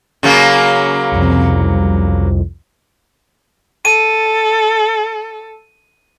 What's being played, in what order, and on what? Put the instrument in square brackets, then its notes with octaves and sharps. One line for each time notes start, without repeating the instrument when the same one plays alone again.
[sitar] C#3 F#3 A#3
[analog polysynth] C2 F2
[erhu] A4 [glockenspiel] D#7